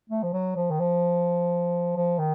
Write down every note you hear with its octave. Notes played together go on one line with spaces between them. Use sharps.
A3
F3
F#3
F3
D#3
F3
F3
D#3